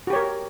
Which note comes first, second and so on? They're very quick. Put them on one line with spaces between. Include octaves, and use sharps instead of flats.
F#4 G4 C#5 A#4